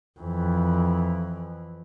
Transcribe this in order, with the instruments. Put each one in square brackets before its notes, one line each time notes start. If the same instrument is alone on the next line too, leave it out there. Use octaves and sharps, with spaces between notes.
[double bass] F2 E3